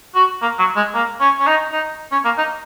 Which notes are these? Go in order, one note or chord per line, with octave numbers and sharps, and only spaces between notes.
F#4
A#3
F#3
G#3
A#3
C#4
C#4
D#4
D#4
C#4
A#3
D#4